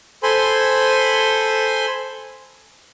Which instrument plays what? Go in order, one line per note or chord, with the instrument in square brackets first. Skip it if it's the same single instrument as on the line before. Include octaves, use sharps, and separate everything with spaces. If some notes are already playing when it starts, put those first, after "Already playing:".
[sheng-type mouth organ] A4 C5 G#5 B5 C6